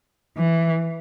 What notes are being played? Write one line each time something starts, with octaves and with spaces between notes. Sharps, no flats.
E3